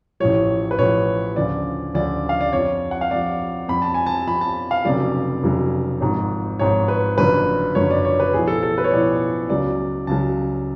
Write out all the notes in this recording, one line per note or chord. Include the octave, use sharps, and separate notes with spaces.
A1 A2 F3 C#5
B4
A1 A2 F3 C#5
D2 C#3 F3 D5
D2 C#3 F3 D5
F5
D5
F2 F3 C#5
F#5
F5
F2 F3 D5
F2 F3 B5
A5
G#5
A5
F2 F3 B5
A5
F5
F1 F2 C#3 F#3 D5
F1 F2 C#3 F#3
G#1 G#2 F3
G#1 G#2 F3 C#5
B4
F#1 F#2 D3 F3 B4
F#1 F#2 D3 F3 C#5
D5
C#5
B4
B1 A2 F3 G#4
A4
A4
B4
C#5
B1 A2 F3 D5
C#2 C#3 F#3 D5
C#2 C#3 F#3 A5